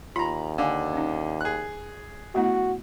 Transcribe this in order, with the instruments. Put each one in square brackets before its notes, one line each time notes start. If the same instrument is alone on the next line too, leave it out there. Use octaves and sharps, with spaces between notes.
[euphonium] D#2 [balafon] F4 [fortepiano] A#5 B5
[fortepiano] D3 [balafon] F5 G#5
[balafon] C#4 D#4
[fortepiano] G#4 F#6
[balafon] A3 B3 E4 [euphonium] F#4